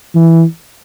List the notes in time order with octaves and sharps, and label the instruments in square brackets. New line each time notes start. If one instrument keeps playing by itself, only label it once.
[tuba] E3